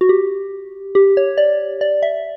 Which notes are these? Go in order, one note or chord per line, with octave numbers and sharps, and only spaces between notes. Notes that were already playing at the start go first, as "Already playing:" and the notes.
F#4
G4
G4
C#5
D5
D5
E5